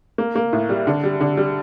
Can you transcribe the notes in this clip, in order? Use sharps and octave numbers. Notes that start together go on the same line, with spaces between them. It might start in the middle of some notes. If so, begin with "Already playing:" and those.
A#3
A#3
A2
G3
D3
G3
D3
G3